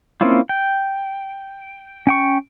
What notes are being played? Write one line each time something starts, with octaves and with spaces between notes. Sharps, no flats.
A#3 C4 C#4 E4 F4
G5
C#4 G5 C#6